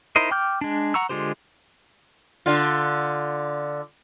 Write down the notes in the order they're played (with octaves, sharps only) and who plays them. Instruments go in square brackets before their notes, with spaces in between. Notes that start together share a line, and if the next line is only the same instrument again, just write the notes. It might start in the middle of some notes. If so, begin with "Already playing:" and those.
[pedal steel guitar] D#4 E4 A#4 C5 D#5
G5 D6 F6 G6
G#3 D4
F#5 A#5 C#6 E6
D3 G#3 F4 G4 C5
[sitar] D3 F4